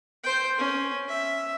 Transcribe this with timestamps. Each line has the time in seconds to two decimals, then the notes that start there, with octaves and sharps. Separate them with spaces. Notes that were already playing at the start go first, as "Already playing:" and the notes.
0.23 C5 G5
0.58 C#4
1.08 E5